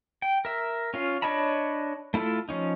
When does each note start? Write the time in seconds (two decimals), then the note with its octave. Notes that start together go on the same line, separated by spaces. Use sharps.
0.22 G5
0.45 A#4 E5
0.94 C#4 F4 F5
1.22 D4 C#5 D#5 A5 B5
2.14 A3 E4 F4 A4
2.49 F3 C#4 D#4